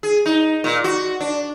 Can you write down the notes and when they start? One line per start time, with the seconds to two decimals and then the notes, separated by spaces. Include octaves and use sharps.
0.03 G#4
0.26 D#4
0.64 A#2
0.84 F#4
1.21 D4